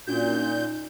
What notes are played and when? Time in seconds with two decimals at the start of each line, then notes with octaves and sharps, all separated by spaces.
0.08 A#2 C#4 D4 F#4 G6
0.28 D#4